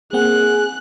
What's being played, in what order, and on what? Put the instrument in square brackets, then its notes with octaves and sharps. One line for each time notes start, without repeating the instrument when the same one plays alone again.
[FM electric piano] A#3 C4 F#5 [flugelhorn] G#4 [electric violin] F#6